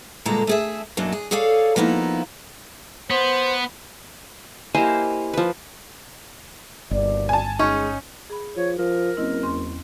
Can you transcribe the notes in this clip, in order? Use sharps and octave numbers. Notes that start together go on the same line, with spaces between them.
G2 A#2 D3 G#3 A4 A#5
A3 G#4 E5
F#2 B2 F#3 A#3 D4
G#4
G#4 A4 C#5 D5 F5
F3 A#3 B3 D#4 E4
B3 C5
A#3 E4 G4 C5 D#5 G#5
F3 B4
G1 D#2 B2 D5
G#5 A5
G#3 C#4 D#4
G#4 B5
F3 C#5
F3 A#4
F#1 C4 E4 D#5
E2 C#4 C6